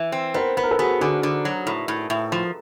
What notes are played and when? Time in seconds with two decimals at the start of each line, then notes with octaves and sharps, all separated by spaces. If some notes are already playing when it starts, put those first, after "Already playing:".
Already playing: E3
0.12 C4
0.34 B3 A#4 C5
0.57 B3 B4
0.63 A#4
0.71 A4 B4
0.78 B3 F#4 G#4
1.01 D3 F#4 G#4
1.23 D3
1.45 F#3
1.67 A2
1.88 A2
2.10 A2
2.32 F3